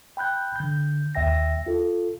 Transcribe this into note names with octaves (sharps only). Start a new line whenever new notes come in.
G5 B5 F#6 G6
D3 G6
D#2 E5 G5 A#6
F4 A4